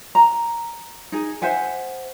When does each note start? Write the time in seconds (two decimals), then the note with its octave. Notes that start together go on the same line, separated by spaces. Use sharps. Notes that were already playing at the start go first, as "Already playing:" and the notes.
0.15 A#5
1.12 D#4 G#4
1.42 C5 E5 F#5 G#5